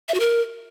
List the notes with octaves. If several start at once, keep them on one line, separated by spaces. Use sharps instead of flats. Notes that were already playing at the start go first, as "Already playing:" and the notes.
E5
F#4
A#4